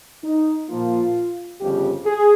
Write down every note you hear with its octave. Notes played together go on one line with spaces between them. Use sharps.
D#4
A#2 F3 A#3 F4
G1 F2 C#3 G4
G#4